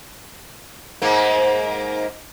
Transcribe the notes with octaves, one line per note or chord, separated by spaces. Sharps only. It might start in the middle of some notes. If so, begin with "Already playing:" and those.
G#2 A#3